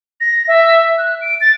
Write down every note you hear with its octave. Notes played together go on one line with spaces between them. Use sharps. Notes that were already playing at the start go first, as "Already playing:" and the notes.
A#6
E5
F#6
D7
A6